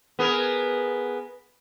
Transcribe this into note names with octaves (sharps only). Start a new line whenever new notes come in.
B3 G#4 A#4